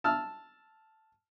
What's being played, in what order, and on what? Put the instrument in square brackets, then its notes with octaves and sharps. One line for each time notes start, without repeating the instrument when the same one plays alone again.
[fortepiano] A5 E6 F6